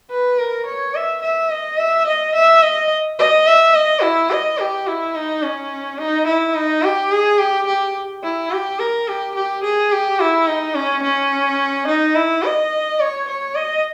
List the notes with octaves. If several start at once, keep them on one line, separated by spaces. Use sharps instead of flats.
B4
A#4
C#5
E5
E5
D#5
E5
D#5
E5
D#5
D#5
E5
D#5
E4
D#5
G4
E4
D#4
C#4
D#4
E4
D#4
G4
G#4
G4
G4
E4
G4
A#4
G4
G4
G#4
G4
E4
D#4
C#4
C#4
D#4
E4
D#5
C#5
C#5
D#5